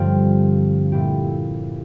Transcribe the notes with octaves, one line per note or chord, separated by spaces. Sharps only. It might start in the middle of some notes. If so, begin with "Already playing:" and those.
Already playing: G2 D3 F3 C4 F4
A#2 A3 E4 G4